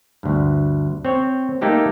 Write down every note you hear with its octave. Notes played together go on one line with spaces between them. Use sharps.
D2 G2
C4 C#5
A3 A#3 D#4 G4 A4